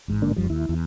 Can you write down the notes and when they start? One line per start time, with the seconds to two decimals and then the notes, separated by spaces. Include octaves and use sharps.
0.08 A1 G#2
0.22 D3 A#3 D4
0.36 F1 F#2 F3 G3
0.50 D#2 E4
0.69 E2